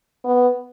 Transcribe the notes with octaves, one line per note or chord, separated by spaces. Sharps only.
B3